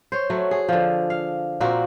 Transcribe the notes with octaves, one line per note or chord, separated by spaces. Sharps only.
C5 C#5
F#3 A3 F#4
G#4
D3 F3
F5
A#2 A#3 C4 F#4